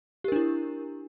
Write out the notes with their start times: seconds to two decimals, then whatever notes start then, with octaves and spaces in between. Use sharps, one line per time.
0.24 G4
0.28 A#4
0.32 D4
0.36 E4